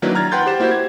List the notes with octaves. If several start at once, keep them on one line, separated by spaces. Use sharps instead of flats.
D#3 F#3 A#3 D4 E4 B4
A#5 F6 G#6 A6
B4 F#5 G5 C6 G6 A6
G4 C5 E7
A#3 E4 F#4 G4 C5
G#6